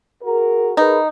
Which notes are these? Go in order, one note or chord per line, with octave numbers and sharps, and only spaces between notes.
F#4 G#4 A#4
D#4 G#4 A#4 B4